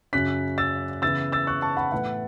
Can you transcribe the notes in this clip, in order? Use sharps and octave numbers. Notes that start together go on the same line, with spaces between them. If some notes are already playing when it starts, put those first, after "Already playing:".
F#2 C#3 F#3 C#4 F#6 B6
E6 A6
C#3 E3 B3 E4 E6 A6
E6 A6
C#6 F#6
A5 C#6
F#5 B5
A2 E3 B3 E4 F#5